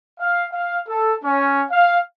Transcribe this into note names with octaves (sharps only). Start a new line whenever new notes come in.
F5
F5
A4
C#4
F5